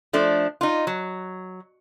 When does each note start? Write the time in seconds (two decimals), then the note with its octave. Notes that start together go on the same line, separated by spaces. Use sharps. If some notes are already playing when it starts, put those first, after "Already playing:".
0.13 F3 A3 D4
0.61 D#4 F4
0.87 F#3